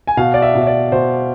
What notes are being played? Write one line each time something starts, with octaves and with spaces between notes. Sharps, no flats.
G#5
B2 F5
D5
E5
B2
E5
D5
B2 C5